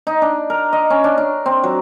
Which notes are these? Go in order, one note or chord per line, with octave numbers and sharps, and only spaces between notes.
D#4
D4
A#4
D#5
C#4
D4
D4
C4
F#3